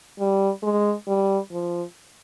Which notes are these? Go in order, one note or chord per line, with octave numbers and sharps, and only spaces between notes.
G3
G#3
G3
F3